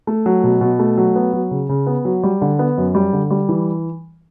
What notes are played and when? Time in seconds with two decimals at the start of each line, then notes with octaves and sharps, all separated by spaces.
0.07 A3
0.26 F#3
0.44 B2
0.61 B2
0.79 A3
0.98 F#3
1.16 B3
1.33 F#3
1.51 C#3
1.69 C#3
1.87 B3
2.05 F#3
2.24 G3
2.42 D3
2.59 B3
2.78 F#2
2.95 G3
3.13 D3
3.31 G3
3.49 E3